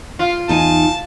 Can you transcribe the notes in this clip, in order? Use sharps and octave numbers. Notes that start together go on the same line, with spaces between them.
F4
E2 D#4 G#5 A5